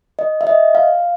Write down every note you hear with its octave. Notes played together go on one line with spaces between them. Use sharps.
D#5
E5
D#5
F5